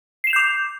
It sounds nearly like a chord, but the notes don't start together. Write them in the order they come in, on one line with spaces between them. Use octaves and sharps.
C7 E7 F7 G6 D6